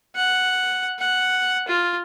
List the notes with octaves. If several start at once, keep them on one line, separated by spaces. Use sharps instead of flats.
F#5
F#5
F4